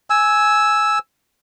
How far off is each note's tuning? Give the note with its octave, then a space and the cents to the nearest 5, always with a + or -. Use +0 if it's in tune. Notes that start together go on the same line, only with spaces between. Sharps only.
G#5 +5 E6 -5